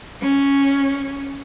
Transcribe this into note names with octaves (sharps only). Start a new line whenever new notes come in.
C#4